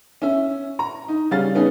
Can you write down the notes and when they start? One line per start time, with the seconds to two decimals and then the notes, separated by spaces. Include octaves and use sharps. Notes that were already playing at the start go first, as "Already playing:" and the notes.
0.22 C#4 E5
0.79 A#5
1.08 D#4
1.31 C#3 G3 C#4 F5 A6
1.55 B3 C#4 D#4 G#4